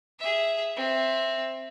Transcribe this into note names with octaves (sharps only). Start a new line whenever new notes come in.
G#4 E5
C4 E5